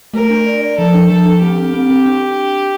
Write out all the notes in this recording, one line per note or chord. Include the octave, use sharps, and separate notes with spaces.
A3 A#4
D4
D5
D5
F3 A4
D4
F3 A4
D4
C4 G4
C4
C4
C4
D4